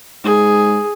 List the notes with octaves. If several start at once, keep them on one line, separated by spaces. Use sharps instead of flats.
G#2 G#4